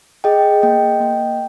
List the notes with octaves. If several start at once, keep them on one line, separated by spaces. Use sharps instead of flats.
G#4 D#5 G5
A#3 D#5 G5
A#3